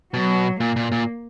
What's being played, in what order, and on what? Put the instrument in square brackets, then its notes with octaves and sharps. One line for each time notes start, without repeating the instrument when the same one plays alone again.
[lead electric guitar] B2 [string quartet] F#3
[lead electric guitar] A#2 [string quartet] A#3
[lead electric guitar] A#2
A#2